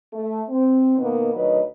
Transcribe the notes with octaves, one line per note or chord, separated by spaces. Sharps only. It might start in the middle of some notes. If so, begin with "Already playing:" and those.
A3
C4
B2 D#3 A#3 B3
D2 D#3 F#3 B4 D#5